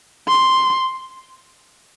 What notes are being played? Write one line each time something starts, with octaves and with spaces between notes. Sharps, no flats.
C6